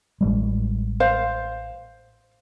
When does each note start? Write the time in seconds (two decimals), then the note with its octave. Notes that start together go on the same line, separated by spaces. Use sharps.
0.21 A1 G3 G#3
1.00 C5 F5